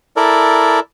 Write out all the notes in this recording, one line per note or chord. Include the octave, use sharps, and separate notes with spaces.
E4 A4 A#4 D5